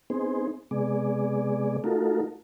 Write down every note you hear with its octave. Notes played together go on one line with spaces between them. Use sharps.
B3 C4 D#4 G#4 C5
C3 G#3 B3 G#4 D5
A3 D#4 F4 F#4 A4 A#4